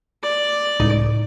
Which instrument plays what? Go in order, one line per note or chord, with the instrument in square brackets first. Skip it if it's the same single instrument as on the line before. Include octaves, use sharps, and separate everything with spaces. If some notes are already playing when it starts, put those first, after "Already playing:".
[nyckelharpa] D5
[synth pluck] C#2 A2 D#4